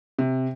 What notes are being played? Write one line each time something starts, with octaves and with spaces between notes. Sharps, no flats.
C3